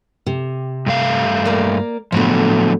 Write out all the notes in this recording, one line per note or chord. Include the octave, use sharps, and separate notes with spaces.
C3
G2 A3 F5
A#3 A#4 D5
A2 D3 F3 F#3 B3